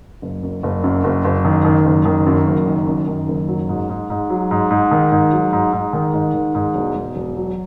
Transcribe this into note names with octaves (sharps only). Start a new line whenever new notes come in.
F#1
F#2
F#1
F#2
F#1
F#1
D#3
D#3
F#1
D#3
F#2
F#1
D#3
F#2
D#3
F#1
F#3
G#2
G#2
G#2
F#3
G#2
G#2
D#3
G#2
F#3
G#2
G#2
D#3
G#2
D#3
G#2
E1
E1
E1
F#3